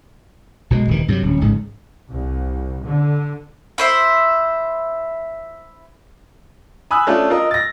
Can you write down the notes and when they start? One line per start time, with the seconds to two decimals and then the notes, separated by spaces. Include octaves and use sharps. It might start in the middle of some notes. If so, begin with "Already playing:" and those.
0.70 B1 B2 F3 G#3
0.88 D#1 C3 D#3 E3
1.08 G2 C3 F3 F#3
1.23 D1 C#4
1.41 A1 G#2 C#3
2.11 C2
2.85 D3
3.78 E4 C5 E5
6.91 G#5 B5 D#6 E6 F#6
7.07 A3 C#4 D4 F4
7.30 F4 A#4 D#5
7.51 A6 A#6